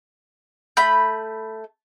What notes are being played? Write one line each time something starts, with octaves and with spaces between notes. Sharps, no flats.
A3 B5 G6